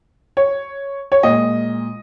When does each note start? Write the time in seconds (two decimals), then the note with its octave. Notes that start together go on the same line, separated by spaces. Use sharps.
0.37 C#5
1.12 C#5
1.23 A#2 G#3 D#5